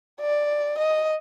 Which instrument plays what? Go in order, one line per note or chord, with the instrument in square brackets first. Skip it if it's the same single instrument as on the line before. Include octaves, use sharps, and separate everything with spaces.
[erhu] D5
D#5